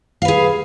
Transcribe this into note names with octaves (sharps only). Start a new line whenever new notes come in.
G#4 B4 F5